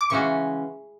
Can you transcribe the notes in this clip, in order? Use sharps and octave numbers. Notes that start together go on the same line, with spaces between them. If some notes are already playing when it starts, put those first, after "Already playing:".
D6
C#3 E3 G#3 C#4 F#4 C#6